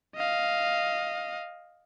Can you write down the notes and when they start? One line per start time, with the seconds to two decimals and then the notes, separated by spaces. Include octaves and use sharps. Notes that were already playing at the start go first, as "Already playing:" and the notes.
0.15 D#5 F5